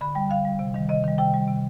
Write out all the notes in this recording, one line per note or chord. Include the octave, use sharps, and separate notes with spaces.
D3 B5
G3 G5
D3 F5
G3
C3
D#3 G3
C3 D#5
D#3 G3
C3 G5
G3
C3